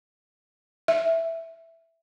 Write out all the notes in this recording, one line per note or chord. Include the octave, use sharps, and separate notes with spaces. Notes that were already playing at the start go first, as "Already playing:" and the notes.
E5